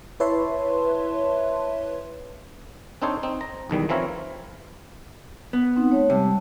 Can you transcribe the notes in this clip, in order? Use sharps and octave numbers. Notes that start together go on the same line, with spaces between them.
E4 B4 C#5 E5 A5 C6
C4 D4 D#4 A4 C5 C#5
C4 D#4
A#5
B1 E2 D#3 G3
E3 F3 C4 E4 A#4 C#5
B3
C4 D#4 F#5
A3 C#5
C3 G3 G#3 A5